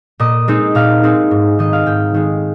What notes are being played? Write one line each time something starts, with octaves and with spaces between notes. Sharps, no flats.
A#2 D#5
G#3 C4 D#4
A#2 F5
G#3 C4 D#4
G#2
D#3 G#3 D#5
F5
G#2 G5
D#3 G#3